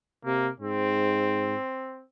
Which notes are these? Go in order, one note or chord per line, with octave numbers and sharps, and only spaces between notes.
C3 A#3
G#2 C4